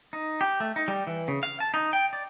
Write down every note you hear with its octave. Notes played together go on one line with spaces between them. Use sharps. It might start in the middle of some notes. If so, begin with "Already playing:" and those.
D#4
G4
A3
D#4
G3
E3
C#3
F5
A5
D#4
G5
D5